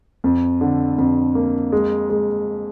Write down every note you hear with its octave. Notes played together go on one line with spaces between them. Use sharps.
F2
D3
F2
A#3
G#3
G#3